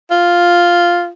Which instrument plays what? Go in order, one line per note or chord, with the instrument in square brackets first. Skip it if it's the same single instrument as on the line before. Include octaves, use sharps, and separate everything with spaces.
[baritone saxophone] F4